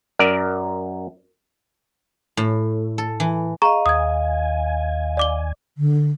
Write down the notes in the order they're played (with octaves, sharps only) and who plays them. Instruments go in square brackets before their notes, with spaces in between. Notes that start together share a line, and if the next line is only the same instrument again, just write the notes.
[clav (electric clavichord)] F#2 A#4 D5
[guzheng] A2
A4
E3
[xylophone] G#4 A#5 C#6 [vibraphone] D#5 F5
[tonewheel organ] D#2 G#5 [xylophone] D#6 G#6
[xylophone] D5 D6 G7
[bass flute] D3